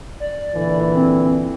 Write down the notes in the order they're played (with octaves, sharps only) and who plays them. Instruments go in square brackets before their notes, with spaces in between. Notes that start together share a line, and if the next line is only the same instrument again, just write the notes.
[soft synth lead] D5
[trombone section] A#2 D3 E3
[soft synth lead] C4